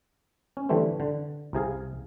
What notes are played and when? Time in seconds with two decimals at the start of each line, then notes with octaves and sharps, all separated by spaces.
0.57 C#4
0.69 D3 E3 G3 A3 C4
1.00 D3
1.53 C2 C3 G#4 F5